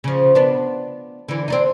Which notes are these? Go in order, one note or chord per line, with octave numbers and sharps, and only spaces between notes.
C#3 F3
B3 D4
D3 E3
C4 D4 D#4